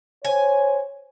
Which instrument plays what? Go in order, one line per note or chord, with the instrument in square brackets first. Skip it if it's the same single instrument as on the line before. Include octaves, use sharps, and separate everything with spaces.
[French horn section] C5 C#5 [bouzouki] G#5